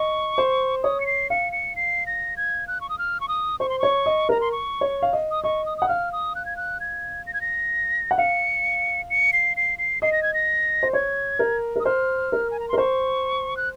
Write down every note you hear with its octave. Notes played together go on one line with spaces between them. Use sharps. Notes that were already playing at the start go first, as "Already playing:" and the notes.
Already playing: D#5 C#6
C5
C#5 D#6
C#7
C7
F5 C#7
C#7
C7
A#6
G#6
F#6
C#6
D#6
F6
C#6
D#6
C5 C#6
C6
C#5 C#6
D#5
A#4 A#5
C6
C#6
C#5
F5
D#5
D#6
D#5 C#6
D#6
F#5 D#6
F5 F6
D#6
F#6
G#6
F#6
G#6
A#6
G#6
A#6
F#5
F5 C#7
C#7
C7
C7
C7
D#5 C7
A#6
G#6
A#6
C5
C#5 G#6
A#4
A#4 D#6
C5 F6
A#4
G#5
A#5
A#4 C6
C5 C#6
F#6